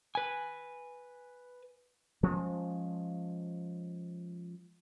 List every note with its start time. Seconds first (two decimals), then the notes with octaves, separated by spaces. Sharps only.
0.15 B4 G#5
2.23 F3 G#3 C#4